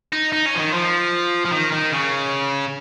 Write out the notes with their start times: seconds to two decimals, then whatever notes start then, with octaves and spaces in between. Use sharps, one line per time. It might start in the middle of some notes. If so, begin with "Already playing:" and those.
0.13 D#4
0.33 D#4
0.46 C#4
0.55 F3
0.59 D#3
0.73 F3
1.45 F3
1.52 D#3
1.72 D#3
1.92 C#3